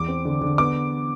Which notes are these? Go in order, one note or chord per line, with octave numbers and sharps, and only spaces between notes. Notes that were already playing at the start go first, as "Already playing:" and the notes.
Already playing: E2 D6
C4
D3
D3
B3 D6